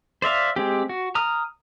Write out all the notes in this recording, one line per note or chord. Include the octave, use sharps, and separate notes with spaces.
C5 D5 E5 F5
G#3 C4 G4
F#4
A#5 D#6 F6